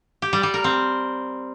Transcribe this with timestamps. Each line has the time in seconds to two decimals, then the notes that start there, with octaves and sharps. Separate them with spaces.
0.22 G4
0.33 G3
0.43 G3
0.54 A#4
0.64 C4